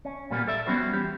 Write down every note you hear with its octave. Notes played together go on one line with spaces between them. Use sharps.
C#4
A#2 G3 A#3 B3
A4 D5 E5
G3 B3 C#4 F#4 C5
E2 G4